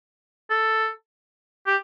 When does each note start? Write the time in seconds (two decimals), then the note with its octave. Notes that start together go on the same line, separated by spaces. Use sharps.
0.50 A4
1.67 G4